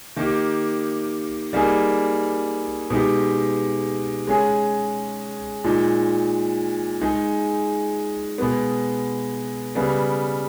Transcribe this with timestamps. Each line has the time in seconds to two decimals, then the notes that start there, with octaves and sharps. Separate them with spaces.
0.16 D#3 A#3 D#4 G4
1.53 G3 A#3 D#4 G#4
2.90 B2 G#3 D#4 G4
4.27 G#3 C#4 G#4
5.64 A#2 G#3 D#4
7.01 G#3 D#4 G#4
8.38 B2 G#3 B3
9.75 C#3 G3 B3